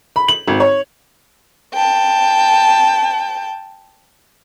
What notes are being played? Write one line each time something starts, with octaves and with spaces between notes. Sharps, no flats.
B5
F#7
G#1
C#5
G5 A5